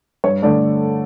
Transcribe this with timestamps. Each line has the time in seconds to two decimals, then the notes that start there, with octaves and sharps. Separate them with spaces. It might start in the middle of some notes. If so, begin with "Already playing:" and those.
0.24 G2 C#5
0.42 D3 A3 D5